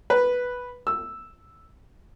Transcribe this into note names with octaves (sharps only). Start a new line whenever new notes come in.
B4
E6